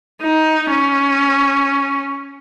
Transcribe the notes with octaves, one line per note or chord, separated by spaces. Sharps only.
D#4
C#4